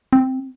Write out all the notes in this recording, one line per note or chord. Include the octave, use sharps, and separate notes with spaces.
C4